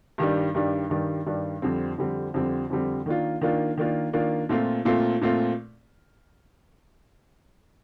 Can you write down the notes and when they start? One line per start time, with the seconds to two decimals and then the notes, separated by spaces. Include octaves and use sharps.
0.18 G2 D#3 G3 D4
0.55 G2 D#3 G3 D4
0.90 G2 D#3 G3 D4
1.26 G2 D#3 G3 D4
1.62 F2 D3 G3 C4
1.98 F2 D3 G3 C4
2.34 F2 D3 G3 C4
2.70 F2 D3 G3 C4
3.06 D#3 A#3 D4 F4
3.41 D#3 A#3 D4 F4
3.78 D#3 A#3 D4 F4
4.13 D#3 A#3 D4 F4
4.49 A#2 A3 C4 F4
4.85 A#2 A3 C4 F4
5.21 A#2 A3 C4 F4